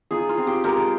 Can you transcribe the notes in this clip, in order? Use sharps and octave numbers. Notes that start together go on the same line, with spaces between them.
D#4 F4 G#4
F4
C4
G4
G#3 G4 A#4